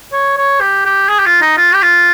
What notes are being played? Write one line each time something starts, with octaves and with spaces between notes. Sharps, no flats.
C#5
C#5
G4
G4
G#4
G4
F4
D#4
F4
G4
F4